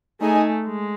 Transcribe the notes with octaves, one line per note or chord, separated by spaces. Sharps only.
A3 D#4 G#4 D#5 G#5
G#3